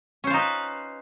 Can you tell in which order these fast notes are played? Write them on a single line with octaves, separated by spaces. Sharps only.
C#4 C5 F4 D#4 B4